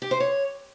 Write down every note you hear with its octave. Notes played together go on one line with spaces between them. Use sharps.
G4
C5
C#5